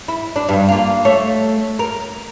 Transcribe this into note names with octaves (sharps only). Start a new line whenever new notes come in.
E4
D4
G2
A#3 D4 F4
A3 C#5
A#4